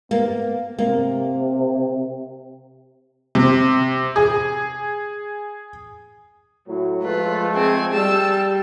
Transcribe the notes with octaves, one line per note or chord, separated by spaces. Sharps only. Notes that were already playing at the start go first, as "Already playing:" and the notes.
A#3 B3
C3 A#3
C3
G#4
A2 F#3
F3 G#3 A3 F4 B4
C4 G#4 G#5
G3 A5 E6